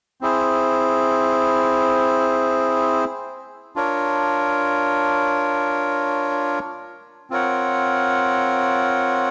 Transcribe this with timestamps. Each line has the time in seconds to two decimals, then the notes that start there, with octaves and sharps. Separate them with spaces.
0.21 C4 E4 G#4 C5
3.76 D4 F4 A#4 C#5
7.30 C4 F4 A#4 C#5 F#5